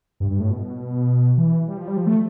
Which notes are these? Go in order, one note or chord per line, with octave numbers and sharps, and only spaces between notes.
G2
G2
A2
B2
E3
G3
F3
G3
F3
A3